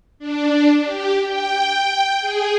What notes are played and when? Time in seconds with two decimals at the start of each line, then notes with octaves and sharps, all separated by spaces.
0.19 D4
0.85 G4
1.26 G5
2.21 G#4